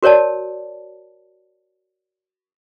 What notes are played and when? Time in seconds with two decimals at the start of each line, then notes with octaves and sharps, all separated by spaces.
0.03 F#4 A#4 C#5 D5 A5